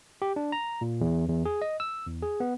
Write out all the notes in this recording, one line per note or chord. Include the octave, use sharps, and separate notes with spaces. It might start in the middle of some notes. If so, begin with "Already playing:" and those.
G4
D4
A#5
A#2
E2
E2
G#4
D#5
E6
E2
G#4
B3